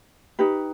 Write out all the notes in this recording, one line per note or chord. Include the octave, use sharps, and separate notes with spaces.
D#4 G4 B4